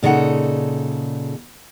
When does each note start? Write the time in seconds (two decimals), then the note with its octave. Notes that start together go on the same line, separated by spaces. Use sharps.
0.03 A#2 C#3 D#4 A4 F#5